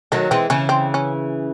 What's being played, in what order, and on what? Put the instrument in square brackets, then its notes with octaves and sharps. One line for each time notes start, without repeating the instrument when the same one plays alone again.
[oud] D#3 F#3 [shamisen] A3
[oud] E3 G#3 [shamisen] C4
[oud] C#3 E3 [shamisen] C#4
[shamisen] C4
C#4